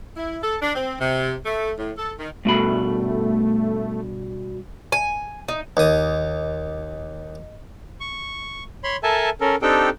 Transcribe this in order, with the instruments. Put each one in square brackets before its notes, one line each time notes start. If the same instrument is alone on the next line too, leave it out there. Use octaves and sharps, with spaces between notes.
[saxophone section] E4
A4
D4
C4
C3
A3
A2
A4
D#3
[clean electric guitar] G2 B2 B5 [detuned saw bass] A3
[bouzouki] G#5
D#4
[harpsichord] D#2 D#6 [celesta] D#5
[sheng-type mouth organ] C#6
C#5 B5 C6
A4 A#4 E5 G#5 A5
C#4 A4 A#4
C4 D4 D#4 G4 A4 G5